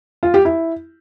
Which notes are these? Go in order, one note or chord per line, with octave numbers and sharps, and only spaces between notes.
F4
G4
E4